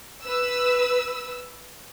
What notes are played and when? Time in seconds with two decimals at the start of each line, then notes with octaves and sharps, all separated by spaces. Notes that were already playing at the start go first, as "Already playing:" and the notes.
0.25 B4 E6